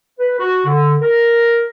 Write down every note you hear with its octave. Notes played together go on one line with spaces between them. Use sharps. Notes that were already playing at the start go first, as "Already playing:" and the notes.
B4
F#4
D3
A#4